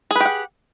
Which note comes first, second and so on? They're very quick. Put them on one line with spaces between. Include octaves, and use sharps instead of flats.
G#4 B4 G4 F#5